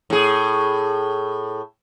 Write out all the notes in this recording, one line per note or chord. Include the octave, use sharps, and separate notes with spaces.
A2 G#4